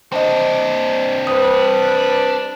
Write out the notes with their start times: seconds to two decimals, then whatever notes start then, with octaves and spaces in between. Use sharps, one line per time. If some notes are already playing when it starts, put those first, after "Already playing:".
0.12 C4 D4 C5 D#5
1.27 G3 B4 C5 D#6